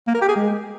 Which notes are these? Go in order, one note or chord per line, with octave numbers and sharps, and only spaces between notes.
A#3
A#4
G4
G#4
G#3